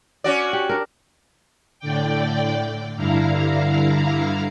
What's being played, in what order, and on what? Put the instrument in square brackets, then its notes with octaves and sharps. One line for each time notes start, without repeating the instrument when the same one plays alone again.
[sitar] C#4 F#4 D5
[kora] G4
D4 A#4
[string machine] A2 D3 D5 G5
G2 D3 E4 F5 A#5